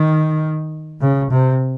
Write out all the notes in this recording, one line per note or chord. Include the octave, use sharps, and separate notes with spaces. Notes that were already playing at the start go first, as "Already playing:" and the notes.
Already playing: D#3
C#3
C3